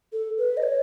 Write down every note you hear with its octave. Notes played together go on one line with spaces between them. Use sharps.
A4
B4
D#5
C#5